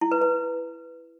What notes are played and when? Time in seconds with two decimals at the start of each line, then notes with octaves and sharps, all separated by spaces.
0.01 E4
0.11 B4
0.22 B4